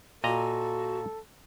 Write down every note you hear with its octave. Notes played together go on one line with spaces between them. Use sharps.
A#2 F#4 A4 D#5 A#5